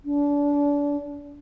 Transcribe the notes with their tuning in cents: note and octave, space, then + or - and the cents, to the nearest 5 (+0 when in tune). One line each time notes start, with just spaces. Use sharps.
D4 -30